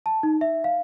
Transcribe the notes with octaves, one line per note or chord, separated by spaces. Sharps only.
A5
D#4
E5
F5